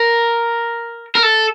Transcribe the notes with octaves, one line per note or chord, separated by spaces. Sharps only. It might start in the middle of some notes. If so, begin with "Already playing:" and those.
Already playing: A#4
A#4
A4